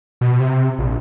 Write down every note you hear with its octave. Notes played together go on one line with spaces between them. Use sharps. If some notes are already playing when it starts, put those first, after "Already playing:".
B2
C3
A#1